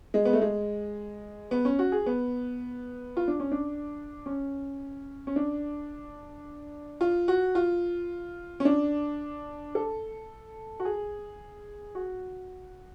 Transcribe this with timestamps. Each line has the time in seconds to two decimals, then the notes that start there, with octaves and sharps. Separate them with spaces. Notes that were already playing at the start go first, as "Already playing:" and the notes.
0.14 G#3
0.25 B3
0.33 A3
0.42 G#3
1.51 B3
1.65 C#4
1.79 F#4
1.92 G#4
2.06 B3
3.17 F4
3.28 D4
3.40 C#4
3.52 D4
4.26 C#4
5.27 C#4
5.36 D4
7.01 F4
7.28 F#4
7.55 F4
8.60 C#4
8.65 D4
9.75 A4
10.80 F#4
10.85 G#4
11.95 F#4